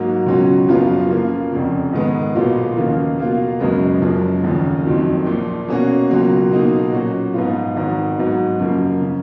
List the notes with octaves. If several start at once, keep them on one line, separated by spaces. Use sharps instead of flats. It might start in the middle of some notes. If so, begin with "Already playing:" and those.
Already playing: G#2 F#3 A#3
C#2 B2 F#3 C#4
F#1 F#2 F3 B3 F4
C#3 F3 A#3 F4
F1 F2 C#3
G#2 D#3 G#3 B3
B1 A#2 F#3 B3 F4
D#2 C#3 F3 A#3 F4
B2 A#3 F4
F#1 F#2 C#3 G#3 B3
F#1 F#2 F3 G#3
F1 D#2 C#3 F3
F#1 F2 D#3 F#3
A#1 A#2 F3
B2 A#3 C#4 F#4
C#2 B2 F#3 A#3
B1 B2 A#3 D#4
A#2 F#3 C#4 F#4
G#2 F3 B3 F4
G#1 G#2 D#3
G#2 F#3 B3
F#2 C#3 F3 A#3
C#3